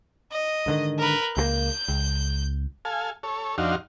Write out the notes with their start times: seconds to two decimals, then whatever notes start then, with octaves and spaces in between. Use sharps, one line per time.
0.32 D#5
0.66 G#2 D3 D#3
0.99 A#4 B4
1.37 C#2 F#3 A#3 G6
1.88 C#2
2.85 A4 F5 G#5
3.23 A4 C#5
3.58 F2 D4 D#4 F#4 F5 C6